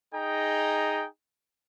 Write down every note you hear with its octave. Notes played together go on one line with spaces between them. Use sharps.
D#4 G#4 D#5 G5 A#5